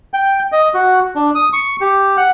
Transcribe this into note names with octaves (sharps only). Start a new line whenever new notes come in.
G5
D#5
F#4
D4
D#6
C#6
G4
F#5